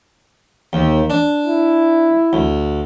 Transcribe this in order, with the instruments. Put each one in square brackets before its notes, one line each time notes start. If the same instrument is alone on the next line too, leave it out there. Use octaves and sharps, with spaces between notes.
[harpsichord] D#2
D4
[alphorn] E4
[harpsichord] D2